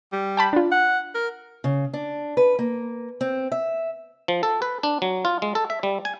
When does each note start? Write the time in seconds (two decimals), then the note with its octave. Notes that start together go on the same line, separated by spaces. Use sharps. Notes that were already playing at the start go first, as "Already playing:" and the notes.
0.13 G3
0.37 G5 A5 B5
0.53 D4 F4
0.72 F#5
1.15 A#4
1.64 C#3
1.93 D4
2.37 B4
2.59 A#3
3.21 C4
3.52 E5
4.28 F3
4.43 A4
4.62 B4
4.83 D4
5.02 F#3
5.25 F4
5.42 G#3
5.55 A4
5.70 E5
5.83 G3
6.05 G#5